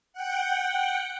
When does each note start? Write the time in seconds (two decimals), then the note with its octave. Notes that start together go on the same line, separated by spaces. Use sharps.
0.13 F#5 G5